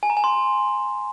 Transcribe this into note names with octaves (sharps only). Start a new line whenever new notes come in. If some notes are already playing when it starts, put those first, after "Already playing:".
G#5
A#5
G#5
C6